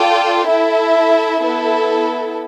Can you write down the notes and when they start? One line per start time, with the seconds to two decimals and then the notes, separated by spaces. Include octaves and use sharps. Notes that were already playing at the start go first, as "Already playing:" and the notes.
Already playing: F4 A4 D5 G5
0.47 E4 A4 E5
1.42 B3 E4 A4